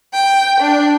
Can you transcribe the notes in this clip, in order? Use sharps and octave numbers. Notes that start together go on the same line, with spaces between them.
G5
D4